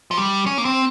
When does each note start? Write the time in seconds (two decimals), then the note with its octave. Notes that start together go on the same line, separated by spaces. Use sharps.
0.11 F3
0.18 G3
0.46 C#4
0.58 A#3
0.65 C4